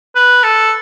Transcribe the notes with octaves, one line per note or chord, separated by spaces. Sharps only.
B4
A4